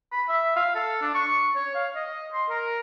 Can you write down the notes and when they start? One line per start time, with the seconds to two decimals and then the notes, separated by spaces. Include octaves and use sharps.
0.13 B5
0.29 E5
0.57 F5
0.75 A4
1.02 D4
1.15 C#6
1.56 C#5
1.75 F5
1.96 D#5
2.34 C6
2.50 A#4